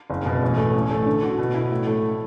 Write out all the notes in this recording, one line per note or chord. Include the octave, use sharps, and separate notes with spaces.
F#1
B2
A1
A3
A1
A3
D3
F#4
B2
E4
A2
A3